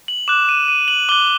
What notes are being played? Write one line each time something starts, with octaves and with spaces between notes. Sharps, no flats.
F#7
D6 F#6 E7
D#7
D#7
F#7
D6 F#6 G7